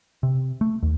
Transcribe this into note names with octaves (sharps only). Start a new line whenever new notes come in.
C3
A3
D#2